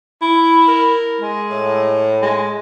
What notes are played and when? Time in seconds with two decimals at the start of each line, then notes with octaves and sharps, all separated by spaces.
0.22 E4
0.68 A#4
1.21 G#3
1.50 A2
2.22 G#3